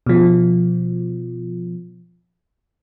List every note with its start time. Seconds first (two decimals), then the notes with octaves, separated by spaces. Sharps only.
0.07 B2 F3